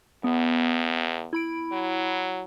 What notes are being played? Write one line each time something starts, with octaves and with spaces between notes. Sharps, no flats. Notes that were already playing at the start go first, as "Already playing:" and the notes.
E2 B3
E4 B5 D7
F#3